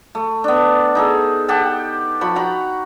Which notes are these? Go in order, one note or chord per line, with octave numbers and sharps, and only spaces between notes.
A3
B3 D4
D#4 G#4 A4
G4 F#5 G5 A5
F3 B5 C#6
F#4 A#5 B5